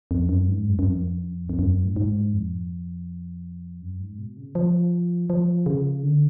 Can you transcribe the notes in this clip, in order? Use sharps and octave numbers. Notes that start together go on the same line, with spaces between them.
F2
F#2
G#2
F#2
F#2
F2
F2
F#2
A2
G#2
F2
F#2
G#2
B2
C#3
F3
F3
C#3
D3